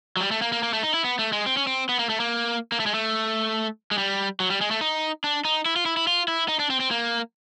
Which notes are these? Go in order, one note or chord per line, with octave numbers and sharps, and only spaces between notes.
F#3
G3
A3
A#3
A#3
A#3
A3
D#4
E4
B3
A3
G#3
C4
C#4
C4
B3
A#3
A3
A#3
A#3
A3
G#3
A3
G#3
G3
F#3
G3
G#3
A3
D#4
D4
D#4
E4
F4
E4
E4
F4
E4
D#4
D4
C4
C4
A#3